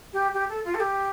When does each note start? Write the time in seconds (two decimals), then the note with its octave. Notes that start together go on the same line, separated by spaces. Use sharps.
0.13 G4
0.34 G4
0.49 A4
0.65 F4
0.74 A4
0.80 G4